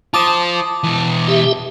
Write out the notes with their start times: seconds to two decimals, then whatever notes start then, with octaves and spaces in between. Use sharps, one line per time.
0.14 F4 C5 A5 D6 D#6
0.84 B2 E3
1.28 G4 E5